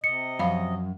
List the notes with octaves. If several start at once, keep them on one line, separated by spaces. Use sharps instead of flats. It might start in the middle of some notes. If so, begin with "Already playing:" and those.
C3 D#5 C#7
F#2 F3 F5 B5